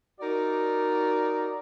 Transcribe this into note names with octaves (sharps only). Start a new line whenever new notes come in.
D#4 F#4 A#4 D5